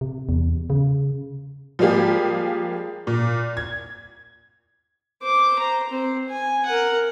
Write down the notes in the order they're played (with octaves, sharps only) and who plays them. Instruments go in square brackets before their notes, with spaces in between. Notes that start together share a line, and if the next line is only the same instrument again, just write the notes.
[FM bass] C3
E2
C#3
[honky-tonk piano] F3 G3 G#3 A#3 G4 G#4
A#2
G#6
[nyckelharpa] C5 D6
C5 A#5
C4 C5
G#5
A#4 F#5